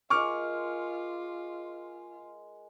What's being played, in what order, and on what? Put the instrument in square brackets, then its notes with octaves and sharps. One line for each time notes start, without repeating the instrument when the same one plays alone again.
[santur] G#3 A#4 [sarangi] F4 [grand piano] C#6 D6 F6